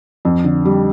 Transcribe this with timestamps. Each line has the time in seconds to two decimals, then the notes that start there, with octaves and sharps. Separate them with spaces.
0.25 F2
0.44 D3
0.65 G3